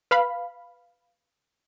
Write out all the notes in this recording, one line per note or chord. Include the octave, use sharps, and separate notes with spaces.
B4 F5 B5